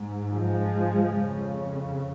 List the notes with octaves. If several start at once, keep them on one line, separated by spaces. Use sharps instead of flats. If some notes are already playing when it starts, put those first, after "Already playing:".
Already playing: G#2
F3 G#3
F2 C#3